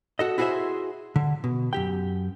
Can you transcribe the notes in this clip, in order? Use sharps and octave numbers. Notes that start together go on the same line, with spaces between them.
F#4 A4 D#5
E4 F#4 G#4 A4 C5 E5
D3
B2
F#2 G4 G5